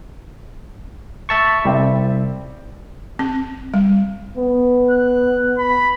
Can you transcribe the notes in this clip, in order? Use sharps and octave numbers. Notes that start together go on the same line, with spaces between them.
E5 A5 C#6
C2 G3 C4 E5
C4
G3
B3
F#6
B5